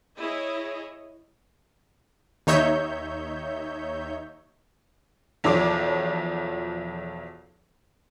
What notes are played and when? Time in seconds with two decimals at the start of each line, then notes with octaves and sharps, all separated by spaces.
0.18 E4 G#4 C#5 D#5
2.47 D#2 D#4 C#5 E5 G6
5.44 B1 E2 F3 C#5 D6